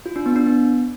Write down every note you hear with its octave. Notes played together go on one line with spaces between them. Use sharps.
F4
D4
B3
D4
B3